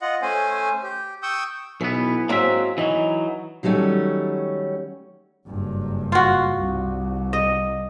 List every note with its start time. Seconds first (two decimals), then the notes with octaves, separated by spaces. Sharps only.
0.02 F4 D#5 F#5
0.22 A3 C#4 C5 G#5
0.83 G4
1.23 G5 C#6 D#6 E6 G6
1.81 B1 E3 B3
2.29 G#2 F#3 A#3 C4 E5
2.78 E3 F#3 D#4
3.63 D#3 F#3 G3 A3 C#4
5.47 F#1 G2
6.12 F4 F#4
6.57 C2
7.33 D#5